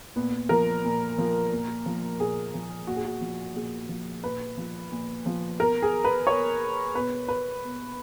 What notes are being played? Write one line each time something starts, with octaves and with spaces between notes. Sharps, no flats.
A#2 B3
F3 A#4
A#2
F3
A#2
F3
A#2 G#4
F3
A#2 F#4
G#4
F#4
F3
A#2 G#4
F3
A#2 B4
F3
A#2
F3
B2 A#4
G#4
B4
B2 C#5
B2 B4
B4
B2